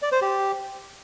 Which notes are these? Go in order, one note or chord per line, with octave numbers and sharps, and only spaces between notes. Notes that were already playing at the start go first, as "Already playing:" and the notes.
D5
C5
G4